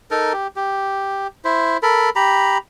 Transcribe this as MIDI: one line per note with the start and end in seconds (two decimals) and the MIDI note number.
0.11 0.33 63
0.11 0.33 69
0.11 0.33 70
0.33 0.47 67
0.56 1.27 67
1.45 1.77 64
1.45 1.77 72
1.83 2.10 69
1.83 2.10 70
1.83 2.10 83
2.16 2.58 67
2.16 2.58 82
2.16 2.58 83